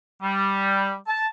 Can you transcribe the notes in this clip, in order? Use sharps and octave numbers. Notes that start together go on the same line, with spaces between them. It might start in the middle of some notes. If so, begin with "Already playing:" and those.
G3
A5